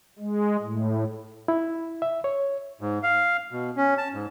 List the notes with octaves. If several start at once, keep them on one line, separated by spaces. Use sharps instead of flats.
G#3
A2
E4
E5
C#5
G#2
F5
B2
C#4
A5
G#2